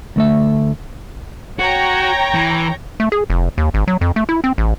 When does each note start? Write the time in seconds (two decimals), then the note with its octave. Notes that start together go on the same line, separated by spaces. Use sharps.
0.16 D2 A3 E5
1.59 F#4 C#5 G5 A#5
2.34 E3
3.00 A3
3.12 G#4
3.30 F1
3.58 D#2
3.74 G#1
3.88 F#3
4.01 F2
4.16 A3
4.29 E4
4.44 C4
4.58 A1